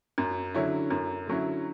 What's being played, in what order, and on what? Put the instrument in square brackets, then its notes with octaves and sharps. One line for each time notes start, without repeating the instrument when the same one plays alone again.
[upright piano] F#2
D3 F#3 C#4 E4
F#2
D3 F#3 C#4 E4